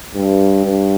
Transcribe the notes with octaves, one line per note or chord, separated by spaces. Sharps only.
G2
G2